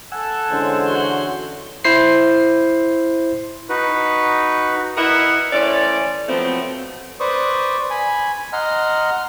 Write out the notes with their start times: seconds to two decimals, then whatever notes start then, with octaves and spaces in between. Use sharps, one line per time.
0.12 A4 F#5 G#5 E6
0.51 D3 E3 G#3 C#4 C5
0.86 F#4 C6
1.85 E4 C5 C7
3.69 D#4 F#4 B4
4.96 E4 A#4 B4 D#5 E5 F#5
5.53 E3 A3 C#4 C5 D5
6.28 F3 F#3 A3 B3 C4
7.20 B4 C5 D5 C#6 D#6
7.90 G#5 B5
8.53 D#5 F#5 A#5 C6 F6